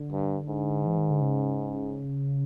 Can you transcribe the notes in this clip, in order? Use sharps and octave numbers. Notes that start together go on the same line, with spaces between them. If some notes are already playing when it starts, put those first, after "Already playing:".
Already playing: D3
G2
G#2
E3
D#3
D3
C#3